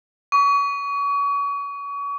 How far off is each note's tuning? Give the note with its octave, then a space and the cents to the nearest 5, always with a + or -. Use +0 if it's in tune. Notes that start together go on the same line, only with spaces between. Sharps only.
C#6 +35